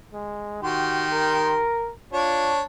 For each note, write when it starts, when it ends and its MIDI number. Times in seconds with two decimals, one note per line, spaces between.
0.13 0.58 56
0.63 1.66 51
0.63 1.06 66
0.63 1.66 67
0.63 1.66 84
1.12 1.92 70
2.13 2.62 62
2.13 2.54 65
2.13 2.62 73